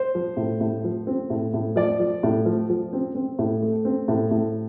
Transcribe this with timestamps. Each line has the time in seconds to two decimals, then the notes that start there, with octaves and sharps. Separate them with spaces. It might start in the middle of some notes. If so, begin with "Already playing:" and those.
Already playing: C5
0.15 F3
0.37 A2
0.61 A2
0.84 F3
1.07 C4
1.30 A2
1.54 A2
1.76 F3 D5
1.99 F3
2.23 A2
2.45 F3
2.70 F3
2.93 C4
3.15 C4
3.39 A2
3.62 A3
3.85 C4
4.08 A2
4.31 A2